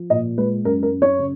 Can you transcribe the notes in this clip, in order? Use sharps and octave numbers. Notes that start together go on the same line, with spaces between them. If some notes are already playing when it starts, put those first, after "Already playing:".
Already playing: F3
A#2 D#5
G#3 B4
F#2 A#4
A#4
F#2
C#5
C#3